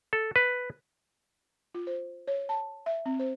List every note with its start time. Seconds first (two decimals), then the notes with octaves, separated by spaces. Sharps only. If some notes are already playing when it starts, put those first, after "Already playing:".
0.13 A4
0.36 B4
1.75 F4
1.87 C5
2.28 C#5
2.49 A5
2.86 E5
3.06 C4
3.19 C5